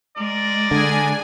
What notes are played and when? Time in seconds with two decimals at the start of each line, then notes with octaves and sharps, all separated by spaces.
0.17 G#3 A#4 D5
0.71 D3 D4 G#4 G#5